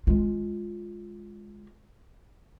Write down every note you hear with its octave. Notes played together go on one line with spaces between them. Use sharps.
G#3 F4